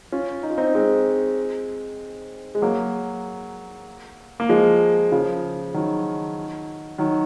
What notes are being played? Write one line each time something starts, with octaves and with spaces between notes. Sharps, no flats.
C#4 F4
D#4
F4
C4 D#4
G#3 C4
G#3
F#3 A#3
A#3
F3 G#3
C#3 F3
D#3 F#3
D#3 F#3